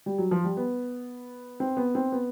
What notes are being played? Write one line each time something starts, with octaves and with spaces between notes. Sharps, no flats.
G3
F#3
F3
G3
B3
C4
B3
C4
B3